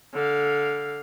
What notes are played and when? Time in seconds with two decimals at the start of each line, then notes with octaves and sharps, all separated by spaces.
0.13 D3 F5